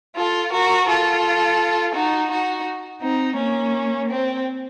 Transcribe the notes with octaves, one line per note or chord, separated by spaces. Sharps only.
F4 A4
F#4 A#4
F4 A4
D#4 F#4
D#4 F#4
C4 D#4
A#3 C#4
C4